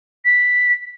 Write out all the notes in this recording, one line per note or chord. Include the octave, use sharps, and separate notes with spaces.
B6